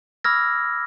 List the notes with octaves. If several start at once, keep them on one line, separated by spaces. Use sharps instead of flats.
B5 D6 E6 F6 G#6 A#6